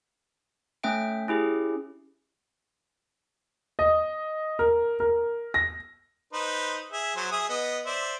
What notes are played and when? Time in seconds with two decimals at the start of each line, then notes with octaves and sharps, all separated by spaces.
0.83 A3 C#4 E5 G5 D7
1.28 C#4 E4 G4 G#4
3.79 D#5
4.59 A#4
5.00 A#4
5.54 A#6
6.33 D#4 B4 C5
6.92 G#4 E5
7.16 F#3 C5
7.32 G#4 E5 D#6
7.49 B3 D#5
7.86 C5 D5 E5